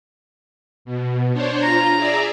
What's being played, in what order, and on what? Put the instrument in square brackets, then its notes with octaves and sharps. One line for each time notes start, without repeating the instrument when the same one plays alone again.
[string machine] B2
D4 C5 C#5
[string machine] F4 [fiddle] A#5
[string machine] G#4 D5 E5